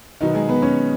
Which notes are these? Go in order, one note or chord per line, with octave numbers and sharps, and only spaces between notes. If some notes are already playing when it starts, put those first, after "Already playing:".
B2 D#3 F#3 B3 D#4
G#3 G#4
B3 B4
C#4 C#5